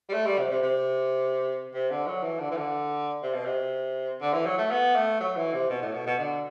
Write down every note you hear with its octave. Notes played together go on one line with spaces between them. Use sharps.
G3
A3
G3
C3
C3
C3
C3
D3
F#3
E3
D3
E3
D3
C3
B2
C3
D3
E3
F#3
A3
B3
A3
F#3
E3
C3
B2
A2
B2
B2
D3